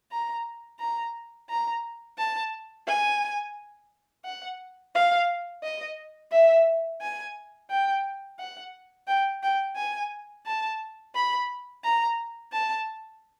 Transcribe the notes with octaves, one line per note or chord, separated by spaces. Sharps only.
A#5
A#5
A#5
A5
G#5
F#5
F5
D#5
E5
G#5
G5
F#5
G5
G5
G#5
A5
B5
A#5
A5